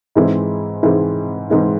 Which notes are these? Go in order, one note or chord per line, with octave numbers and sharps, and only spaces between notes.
G#2 E3 G#3 C4 E4
G#2 E3 G#3 C4 E4
G#2 E3 G#3 C4 E4